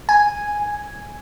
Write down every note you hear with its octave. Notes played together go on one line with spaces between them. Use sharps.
G#5